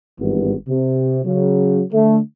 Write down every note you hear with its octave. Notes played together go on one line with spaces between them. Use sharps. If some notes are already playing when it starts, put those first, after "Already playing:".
G#1 G2 E3 G3 B3
C3
C#3 F#3
D3 A3